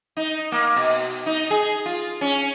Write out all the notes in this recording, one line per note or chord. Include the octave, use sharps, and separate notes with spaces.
D#4
A#3
B2
D#4
G#4
F4
C#4